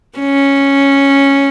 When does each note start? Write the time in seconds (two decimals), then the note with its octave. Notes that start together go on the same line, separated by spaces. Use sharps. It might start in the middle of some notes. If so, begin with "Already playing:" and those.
0.19 C#4